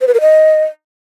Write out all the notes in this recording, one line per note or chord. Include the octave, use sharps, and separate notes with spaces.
C5
B4
A#4
D#5